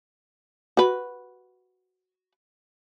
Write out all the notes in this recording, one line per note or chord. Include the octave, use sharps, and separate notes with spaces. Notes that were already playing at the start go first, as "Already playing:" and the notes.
F#4 B4